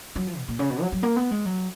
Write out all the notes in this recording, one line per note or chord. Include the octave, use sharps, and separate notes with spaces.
F#3
F3
B2
A#2
C#3
B2
F#3
F#3
A#3
B3
G#3
F#3